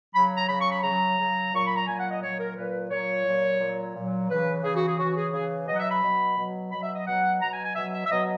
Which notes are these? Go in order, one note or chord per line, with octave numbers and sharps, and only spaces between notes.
C#3 F#3 B5
A#5
C#3 F#3 B5
C#6
B5
C#3 F#3 A#5
C#3 F#3
A#2 F#3 C#6
B5
A#5
A#2 F#3 G#5
F#5
D#5
A#2 F#3 C#5
A#4
A#2 F#3 B4
A#2 F#3 C#5
A#2 F#3
A#2 F#3
A#2 F#3
C#3 E3 B4
C#3 E3 G#4
F#4
G#4
C#3 E3 F#4
G#4
C#3 E3 G#4
B2 F#3 D#5
F#5
E5
B5
B2 F#3
B2 F#3
B2 F#3 B5
E5
D#5
B2 F#3 F#5
B2 F#3 A#5
G#5
G#5
B2 F#3 E5
E5
E5
B2 F#3 D#5